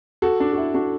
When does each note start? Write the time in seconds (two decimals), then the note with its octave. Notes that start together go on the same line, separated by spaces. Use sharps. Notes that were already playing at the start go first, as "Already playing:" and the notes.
0.22 F#4 A4
0.40 D4
0.53 F#4
0.58 E4
0.74 D4 F#4